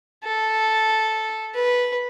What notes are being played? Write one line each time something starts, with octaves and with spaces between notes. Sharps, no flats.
A4
B4